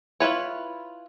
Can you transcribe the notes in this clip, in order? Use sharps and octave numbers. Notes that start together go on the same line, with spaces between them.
E4 F4 B4 C#5